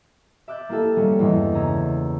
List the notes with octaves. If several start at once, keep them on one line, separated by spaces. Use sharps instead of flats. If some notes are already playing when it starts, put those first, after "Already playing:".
E5 D6 F#6 G6 A6
A#3 E4 G4 A4
G3 A#3 B3 C#4
E2 G2 E3 G#3 D4
C#3 C#4 A#5 E6 G#6